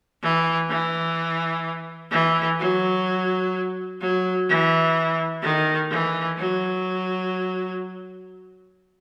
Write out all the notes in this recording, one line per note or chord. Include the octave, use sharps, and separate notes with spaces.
E3
E3
E3
F#3
F#3
E3
D#3
E3
F#3